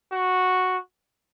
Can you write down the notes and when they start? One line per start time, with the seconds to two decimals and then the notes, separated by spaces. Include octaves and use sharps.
0.12 F#4